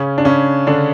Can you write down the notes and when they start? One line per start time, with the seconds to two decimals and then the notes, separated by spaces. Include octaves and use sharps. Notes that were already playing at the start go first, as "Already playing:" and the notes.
Already playing: C#3 C#4
0.18 D4
0.25 C#3 C#4
0.67 D3 D4